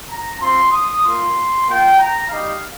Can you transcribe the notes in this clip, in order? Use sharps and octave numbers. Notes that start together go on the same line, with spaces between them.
A#5
C4 F4 C6
D#6
A#3 F4 C6
A#3 F4 G5
A#5
G3 D#4 G4 F5